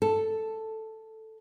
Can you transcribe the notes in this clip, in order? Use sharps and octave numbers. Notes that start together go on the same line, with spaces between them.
A4